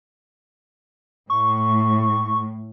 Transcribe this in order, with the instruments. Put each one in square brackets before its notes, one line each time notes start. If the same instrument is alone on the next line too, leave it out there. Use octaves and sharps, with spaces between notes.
[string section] A2 [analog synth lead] C#6